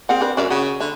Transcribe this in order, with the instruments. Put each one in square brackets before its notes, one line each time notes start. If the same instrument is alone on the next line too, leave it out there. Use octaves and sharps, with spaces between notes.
[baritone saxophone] C4 [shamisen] G#4 A#4 F#5
[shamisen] D4 A#4 B4
[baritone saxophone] F#2 [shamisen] C#4 D5 E5
[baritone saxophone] C#3 [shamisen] F#4
[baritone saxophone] D3 [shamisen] E5